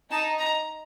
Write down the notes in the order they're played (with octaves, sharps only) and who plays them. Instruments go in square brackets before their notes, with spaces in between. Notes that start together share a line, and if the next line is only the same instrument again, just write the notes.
[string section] D#4 [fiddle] A5
[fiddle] A#5